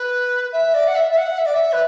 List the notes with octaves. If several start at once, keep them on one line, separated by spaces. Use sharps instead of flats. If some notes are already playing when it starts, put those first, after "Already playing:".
Already playing: B4
E5
D5
F#5
E5
E5
F#5
E5
D5
E5
B4